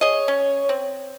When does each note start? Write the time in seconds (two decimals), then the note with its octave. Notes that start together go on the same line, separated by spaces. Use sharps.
0.01 G#4 C#5 D#5
0.28 C#4
0.69 C4